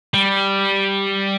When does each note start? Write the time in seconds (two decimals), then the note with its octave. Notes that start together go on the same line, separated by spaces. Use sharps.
0.14 G3